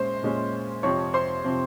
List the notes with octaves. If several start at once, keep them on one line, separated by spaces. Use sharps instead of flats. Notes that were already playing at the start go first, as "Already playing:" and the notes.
Already playing: A#2 G#3 C#4 C5 C6
A#2 G#3 C#4
F2 C3 F3 C4 C#5 C#6
C5 C6
C3 F3 C4